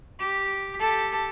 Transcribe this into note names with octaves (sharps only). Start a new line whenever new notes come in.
G4
G4 A4